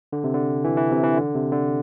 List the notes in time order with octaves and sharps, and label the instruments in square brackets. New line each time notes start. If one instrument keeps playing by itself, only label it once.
[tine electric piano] D3
C3
D3
E3
E3
C3
E3
D3
C3
D3